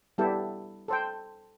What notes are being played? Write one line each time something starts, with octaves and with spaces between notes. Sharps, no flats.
G3 B3 E4 G4 A4 G5
A4 C5 G5